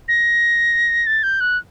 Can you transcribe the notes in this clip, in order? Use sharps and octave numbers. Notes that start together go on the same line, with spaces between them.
A#6
A6
G6
F#6